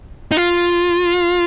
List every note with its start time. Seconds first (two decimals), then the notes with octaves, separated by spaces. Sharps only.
0.31 D#4
0.37 F4